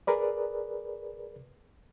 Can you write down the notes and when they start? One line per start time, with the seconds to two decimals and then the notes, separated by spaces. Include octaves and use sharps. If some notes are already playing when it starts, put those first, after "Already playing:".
0.07 G#4 A#4 B4 D5